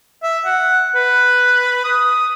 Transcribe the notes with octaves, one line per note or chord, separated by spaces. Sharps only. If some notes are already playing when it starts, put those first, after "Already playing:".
E5
F#5
B4
D#6